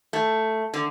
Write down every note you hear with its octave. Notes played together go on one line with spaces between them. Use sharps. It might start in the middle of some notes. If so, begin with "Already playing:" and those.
A3
D3